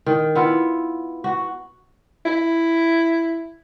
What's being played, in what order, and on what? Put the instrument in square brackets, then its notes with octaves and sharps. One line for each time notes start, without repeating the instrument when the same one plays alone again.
[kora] D#3
B3 E4 F4
F#4
[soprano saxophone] E4